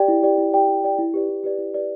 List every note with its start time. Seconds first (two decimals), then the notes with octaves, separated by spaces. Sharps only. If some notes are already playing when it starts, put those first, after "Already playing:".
Already playing: G4 D5 G5
0.08 E4
0.23 G4 D5 G5
0.38 E4
0.53 G4 D5 G5
0.68 E4
0.84 G4 D5 G5
0.98 E4
1.14 G4 B4 D5
1.29 E4
1.44 G4 B4 D5
1.59 E4
1.74 G4 B4 D5